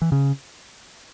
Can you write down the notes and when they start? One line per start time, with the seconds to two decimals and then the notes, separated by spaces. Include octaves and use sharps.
0.02 E3
0.12 C#3